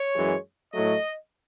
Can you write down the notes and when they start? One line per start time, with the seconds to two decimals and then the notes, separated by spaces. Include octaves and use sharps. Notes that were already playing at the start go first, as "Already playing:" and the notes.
Already playing: C#5
0.13 F#2 E3 G#3
0.73 A2 F#3 A3 D#5